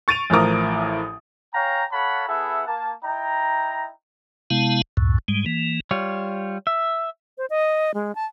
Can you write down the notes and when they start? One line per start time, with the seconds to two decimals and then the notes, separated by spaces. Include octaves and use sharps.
0.08 C#6 A6 D7 D#7 F7
0.30 A1 A2 F3 A#4 D6 D#6
1.54 C#5 F5 G5 G#5 A#5
1.92 A4 C#5 F5 F#5 A5 B5
2.28 B3 E4 G#4 A4 E5 F#5
2.67 A#3 A5
3.03 D#4 E4 G5 A#5
4.50 C3 G#3 B3 E4 F5 A5
4.97 C#2 F#2 A2
5.28 G#2 G3 G#3
5.46 E3 A#3
5.91 G3 F4 C#5
6.67 E5
7.38 C5
7.50 D#5
7.94 G#3
8.15 A5